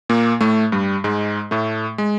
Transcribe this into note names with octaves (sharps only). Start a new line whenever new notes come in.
A#2 A#3
A2 A3
G2 G3
G#2 G#3
A2 A3
G#3